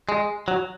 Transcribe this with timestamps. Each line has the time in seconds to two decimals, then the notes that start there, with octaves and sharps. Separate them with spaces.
0.09 G#3
0.48 F#3